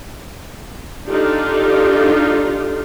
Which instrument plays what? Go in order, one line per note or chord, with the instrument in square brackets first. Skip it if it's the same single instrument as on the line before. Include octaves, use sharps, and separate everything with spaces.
[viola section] D4 D#4 F4 G4 A4